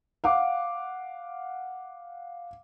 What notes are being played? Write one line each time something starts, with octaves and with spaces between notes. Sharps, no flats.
F5 F#5 D6